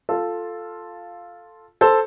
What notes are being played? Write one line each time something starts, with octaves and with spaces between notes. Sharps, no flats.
F4 A4
A4 C5